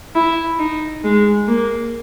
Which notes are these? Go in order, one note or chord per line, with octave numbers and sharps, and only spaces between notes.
E4
D#4
G#3
A#3